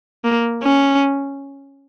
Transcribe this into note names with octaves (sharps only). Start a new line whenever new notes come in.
A#3
C#4